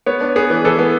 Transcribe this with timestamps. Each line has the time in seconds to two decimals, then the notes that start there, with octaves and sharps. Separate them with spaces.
0.06 B3 C#5
0.21 D4
0.36 B3 G#4
0.50 E3
0.65 E3 A4
0.79 B3